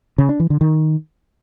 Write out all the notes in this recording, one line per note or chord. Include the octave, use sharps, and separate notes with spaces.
C#3
D4
E3
D3
D#3